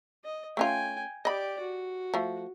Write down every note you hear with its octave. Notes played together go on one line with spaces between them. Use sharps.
D#5
A3 C#4 F4 G5 G#5
G4 D5 D#5 B5
F#4
F3 A3